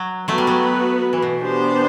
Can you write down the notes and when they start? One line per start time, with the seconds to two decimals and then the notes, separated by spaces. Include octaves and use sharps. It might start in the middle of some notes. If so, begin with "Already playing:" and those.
Already playing: F#3
0.28 F#3 A3 B3 F#4 B4
0.38 G3
0.47 F#3
1.13 E3
1.22 B2
1.40 B3 D4 G4 C5